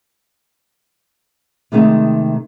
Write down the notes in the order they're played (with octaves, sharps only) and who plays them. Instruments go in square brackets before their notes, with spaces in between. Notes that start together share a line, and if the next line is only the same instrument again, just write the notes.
[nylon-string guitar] C3 D#3 G#3 A3 D#4